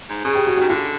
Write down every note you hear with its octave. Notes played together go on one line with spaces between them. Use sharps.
G#2
C#3 G#4
G4
F#4
F#4
D#3
D3 F4